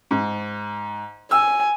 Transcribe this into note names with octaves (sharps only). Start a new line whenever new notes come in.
G#2
G#5 E6